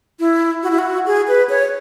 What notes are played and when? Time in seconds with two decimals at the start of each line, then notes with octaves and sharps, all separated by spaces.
0.19 E4
0.63 F#4
0.70 E4
0.79 F#4
1.06 G#4
1.28 B4
1.49 C#5